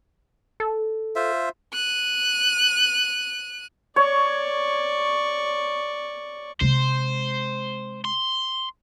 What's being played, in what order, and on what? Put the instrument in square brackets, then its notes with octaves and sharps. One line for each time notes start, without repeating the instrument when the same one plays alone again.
[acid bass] A4
[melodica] F4 C5 E5
[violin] F#6 D#7
[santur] C#5 [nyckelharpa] D5 C#6
[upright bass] C3 G#3 [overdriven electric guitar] C5
[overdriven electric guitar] C6